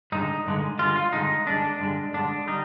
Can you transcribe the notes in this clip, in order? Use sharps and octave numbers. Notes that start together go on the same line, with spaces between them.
G2 D3 G#3 D#4
G2 D3 G#3
G2 D3 G#3 F4
F4
G2 D3 G#3 D#4
G2 D3 G#3 D4
G2 D3 G#3
G2 D3 G#3 D4
D3 G3 D#4